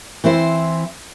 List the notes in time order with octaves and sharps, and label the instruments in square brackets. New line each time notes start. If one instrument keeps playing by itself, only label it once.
[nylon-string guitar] E3 C4 E4 C5